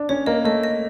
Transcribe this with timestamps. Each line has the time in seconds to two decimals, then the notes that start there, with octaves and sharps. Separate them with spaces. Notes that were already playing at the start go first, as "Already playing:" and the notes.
Already playing: D4
0.09 C#4 C#5
0.26 A#3 D#5
0.45 A3 D#5
0.63 D#5